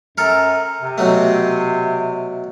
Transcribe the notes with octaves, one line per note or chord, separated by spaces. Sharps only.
F#2 A4 A#4
C3
B2 F#3 A3